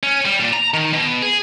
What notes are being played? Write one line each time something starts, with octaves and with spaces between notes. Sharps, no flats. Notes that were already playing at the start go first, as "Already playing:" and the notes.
C#4
G3
A#2
A#5
D#3
B2
G#4